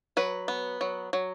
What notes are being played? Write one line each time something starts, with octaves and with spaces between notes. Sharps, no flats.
F#3 B4
B3
F#3
F#3